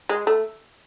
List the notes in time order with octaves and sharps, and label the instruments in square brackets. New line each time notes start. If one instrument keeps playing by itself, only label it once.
[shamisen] G#3
A3